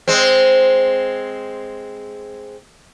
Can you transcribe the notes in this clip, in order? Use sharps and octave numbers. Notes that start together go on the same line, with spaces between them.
G#3 C4